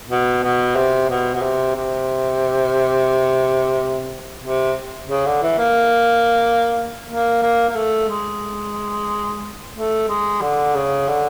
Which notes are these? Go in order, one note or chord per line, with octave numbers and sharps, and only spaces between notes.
B2
B2
C3
B2
B2
C3
C3
C3
C#3
D3
E3
A#3
A#3
A#3
A#3
A3
G#3
A3
G#3
D3
C#3
D3